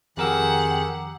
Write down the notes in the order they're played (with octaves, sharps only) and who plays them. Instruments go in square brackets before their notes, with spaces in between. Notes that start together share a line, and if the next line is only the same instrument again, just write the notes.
[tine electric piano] F2 A#4 E6 [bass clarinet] D#3 [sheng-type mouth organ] G4 G#4 [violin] F#5